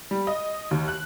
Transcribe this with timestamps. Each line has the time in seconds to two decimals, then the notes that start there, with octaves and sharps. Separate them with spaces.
0.11 G3
0.27 D#5
0.71 D#2
0.88 F#6